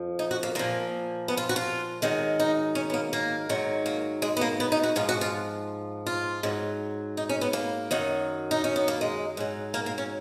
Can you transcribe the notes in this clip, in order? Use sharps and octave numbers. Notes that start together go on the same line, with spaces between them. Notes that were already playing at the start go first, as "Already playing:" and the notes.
Already playing: F2 F3
D#4
F#4
A#3
A#2 F3 A#3
B3
F4
F#4
F4
G#2 D#3 F#3
D#4
C#4
B3
A#3
A#3
G#2 D#3 F#3
A#3
G#3
B3
A#3
B3
D#4
F#4
G#2 F3 F4
F#4
F4
F4
G#2 F#3
D#4
C#4
B3
A#3
F#2 D#3 F#3
D#4
C#4
B3
A#3
G#3
G#2 F#3
A#3
A#3
C#4